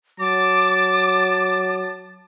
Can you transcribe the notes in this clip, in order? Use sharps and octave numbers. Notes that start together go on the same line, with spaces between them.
F#3 A5 D6